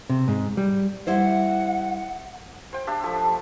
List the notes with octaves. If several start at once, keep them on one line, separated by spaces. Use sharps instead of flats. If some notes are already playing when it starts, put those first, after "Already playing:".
C3
G#2
G3
G3 E4 C5 F#5
C5 G5
D4 G4 E5
F3 A3 G4